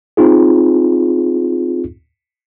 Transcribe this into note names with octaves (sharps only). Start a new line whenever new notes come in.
C4 D#4 F4 G#4